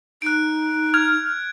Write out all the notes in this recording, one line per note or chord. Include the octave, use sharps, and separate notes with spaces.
D#4 F#6 D7
F6 G#6